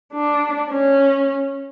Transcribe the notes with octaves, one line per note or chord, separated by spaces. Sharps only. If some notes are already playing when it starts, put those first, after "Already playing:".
D4
C#4